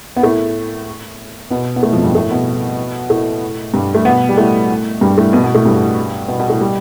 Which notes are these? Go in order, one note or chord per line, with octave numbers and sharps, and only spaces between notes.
B3
A2 A3
B2 B3
B3
A2 A3
F2 F3
G2 G3
A2 A3
B2 B3
A2 A3
G2 G3
A3
B2 B3
G3
A2 A3
G2 G3
A2 A3
B2 B3
B2 B3
A2 A3
G2 G3
B2 B3
B2 B3
A2 A3
G3